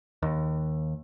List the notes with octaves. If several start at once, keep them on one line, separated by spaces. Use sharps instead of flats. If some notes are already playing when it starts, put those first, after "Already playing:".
D#2